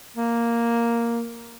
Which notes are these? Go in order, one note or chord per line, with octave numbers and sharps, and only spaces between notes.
A#3